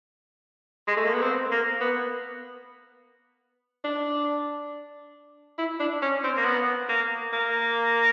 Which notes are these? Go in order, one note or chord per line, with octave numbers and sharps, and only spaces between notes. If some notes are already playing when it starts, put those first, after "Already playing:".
G#3
A3
A#3
B3
C4
A#3
B3
D4
E4
D4
C#4
C4
A#3
B3
A#3
A#3